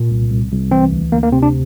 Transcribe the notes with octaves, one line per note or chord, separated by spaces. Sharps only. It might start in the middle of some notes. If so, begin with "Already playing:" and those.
Already playing: A#2
C2
C2
C2
E3 C4
D2
D2 A#3
A#3
C3 C4
D4